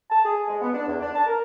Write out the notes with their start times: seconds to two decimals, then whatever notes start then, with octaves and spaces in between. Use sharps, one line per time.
0.10 A5
0.25 G#4
0.47 G#3
0.62 B3
0.73 D4
0.88 E2
1.00 D4
1.14 A5
1.27 A#4